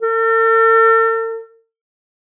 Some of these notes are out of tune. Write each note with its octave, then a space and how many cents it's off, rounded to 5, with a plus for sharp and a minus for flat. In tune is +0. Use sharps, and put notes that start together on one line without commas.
A4 +45